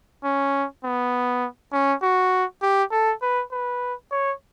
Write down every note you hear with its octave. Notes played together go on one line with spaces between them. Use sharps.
C#4
B3
C#4
F#4
G4
A4
B4
B4
C#5